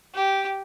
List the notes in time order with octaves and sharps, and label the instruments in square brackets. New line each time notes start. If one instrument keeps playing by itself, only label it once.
[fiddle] G4